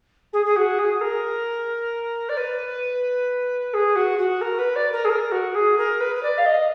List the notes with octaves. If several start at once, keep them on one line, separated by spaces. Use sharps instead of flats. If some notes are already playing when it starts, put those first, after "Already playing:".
G#4
G#4
F#4
G#4
A#4
D5
B4
G#4
F#4
F#4
A#4
B4
D5
A#4
G#4
A#4
F#4
G#4
A#4
B4
B4
D5
F5
D#5